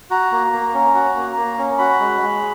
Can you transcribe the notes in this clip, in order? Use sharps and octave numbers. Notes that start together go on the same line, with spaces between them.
F#4 A#5
A#3
A#3
C#4
F#4
A#3
A#3
C#4
F#4 B5
G#3
G#3